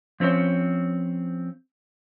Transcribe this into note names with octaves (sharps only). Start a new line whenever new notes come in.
F3 C4 C#4 C5 C#5